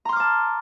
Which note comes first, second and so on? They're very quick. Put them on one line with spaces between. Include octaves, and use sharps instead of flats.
A#5 C6 F6 D6 A5